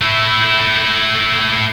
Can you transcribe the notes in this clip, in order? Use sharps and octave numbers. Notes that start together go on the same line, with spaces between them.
A3 E4